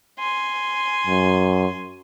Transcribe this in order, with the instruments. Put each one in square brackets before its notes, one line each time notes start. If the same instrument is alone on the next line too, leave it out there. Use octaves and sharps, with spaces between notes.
[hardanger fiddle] G#5 C6
[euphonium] F#2